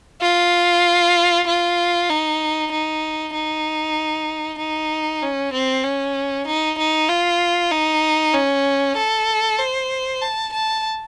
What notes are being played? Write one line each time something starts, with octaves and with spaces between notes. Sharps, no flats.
F4
F4
D#4
D#4
D#4
D#4
C#4
C4
C#4
D#4
D#4
F4
D#4
C#4
A4
C5
A5
A5